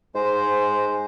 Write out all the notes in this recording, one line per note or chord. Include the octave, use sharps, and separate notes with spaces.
G#2 G#3 C5